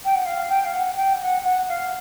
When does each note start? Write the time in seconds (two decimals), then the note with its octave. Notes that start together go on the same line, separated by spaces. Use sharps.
0.05 G5
0.15 F#5
0.26 F5
0.50 G5
0.65 F5
0.74 F#5
0.97 G5
1.22 F#5
1.45 F#5
1.69 F5